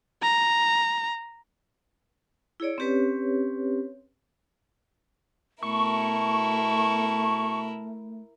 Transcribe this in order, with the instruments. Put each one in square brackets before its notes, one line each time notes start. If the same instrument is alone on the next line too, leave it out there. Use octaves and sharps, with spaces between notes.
[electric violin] A#5
[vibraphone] E4 G#4 C#5 D5
C4 C#4 G4 B4 C#5
[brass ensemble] B2 A5 [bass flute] A3 [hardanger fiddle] E4 A#4 [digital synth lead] C#6